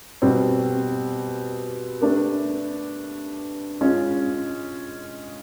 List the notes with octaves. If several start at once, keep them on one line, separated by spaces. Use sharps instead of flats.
B2 G3 C4
A3 D4 G4 B4
G#3 C#4 F4